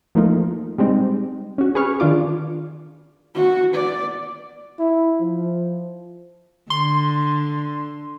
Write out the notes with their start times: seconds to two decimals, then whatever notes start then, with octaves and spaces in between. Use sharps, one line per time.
0.15 F3 A3 A#3 D#4 F4
0.78 G3 G#3 C4 D#4
1.58 C#4 F#4
1.75 G#4 B4 C#6 F6
2.00 D#3 D4 F4 D6
3.35 F#4
3.74 D5
4.79 E4
5.20 F3
6.70 D3 C6